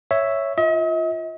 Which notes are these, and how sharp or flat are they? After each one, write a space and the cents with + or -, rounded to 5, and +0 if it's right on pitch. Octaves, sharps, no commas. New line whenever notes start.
C#5 +0 E5 +0
F4 +0 D#5 +45